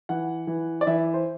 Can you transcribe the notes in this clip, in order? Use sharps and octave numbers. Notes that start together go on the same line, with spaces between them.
E3 F#5
E3
D5
E3 E5
C5